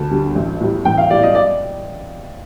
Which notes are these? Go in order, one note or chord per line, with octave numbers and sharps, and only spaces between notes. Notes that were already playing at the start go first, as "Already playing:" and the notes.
Already playing: D2 D3 A5
D3 G3
A1
A2 G3
A1 G5
F5
A2 G3 D5
D#5
D5